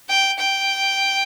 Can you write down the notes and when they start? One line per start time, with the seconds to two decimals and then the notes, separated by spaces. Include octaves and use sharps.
0.09 G5
0.39 G5